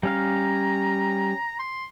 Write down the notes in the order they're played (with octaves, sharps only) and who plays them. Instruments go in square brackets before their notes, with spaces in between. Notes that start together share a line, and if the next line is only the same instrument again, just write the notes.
[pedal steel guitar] G3 C#4 F5 [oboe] A#5
[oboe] C6